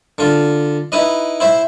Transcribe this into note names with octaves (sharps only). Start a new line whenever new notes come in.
D3 F4
D#4 E4 B4 D#5
E4 C5 E5